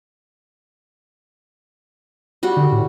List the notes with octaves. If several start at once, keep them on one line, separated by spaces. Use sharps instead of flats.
G3 F#4
D3
A2